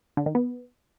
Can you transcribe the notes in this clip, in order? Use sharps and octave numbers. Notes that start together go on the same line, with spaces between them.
D3
D#3
B3